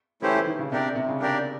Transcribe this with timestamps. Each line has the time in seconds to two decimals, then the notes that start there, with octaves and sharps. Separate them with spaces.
0.22 E3 A3 C#4 E4 G4 C5
0.34 E3
0.47 D#3
0.59 C#3
0.71 C3 D4 G4 A#4 D5
0.95 C3
1.09 C#3
1.20 C#3 D4 G4 A#4 D5